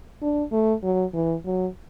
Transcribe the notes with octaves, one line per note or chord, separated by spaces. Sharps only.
D4
A3
F#3
E3
F#3